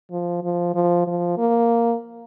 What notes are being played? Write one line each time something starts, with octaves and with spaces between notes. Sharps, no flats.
F3
F3
F3
F3
A#3